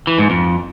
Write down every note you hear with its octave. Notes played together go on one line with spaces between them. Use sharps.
E3
G#2
F2